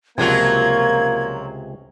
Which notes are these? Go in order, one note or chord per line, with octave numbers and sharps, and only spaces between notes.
C#2 C3 F3 F#3 A#3 F4 G#6